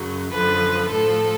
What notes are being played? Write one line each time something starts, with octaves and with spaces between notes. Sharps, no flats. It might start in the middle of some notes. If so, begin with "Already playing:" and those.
Already playing: F#2 C#3 F#3
F#2 D3 F3 B4
A2 F3 A4